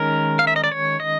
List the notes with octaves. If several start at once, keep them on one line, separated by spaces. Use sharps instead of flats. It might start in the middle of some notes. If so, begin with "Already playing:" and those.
Already playing: D#3 G#3 C#4 A#4
F5
E5
D#5
D5
C#5
D#5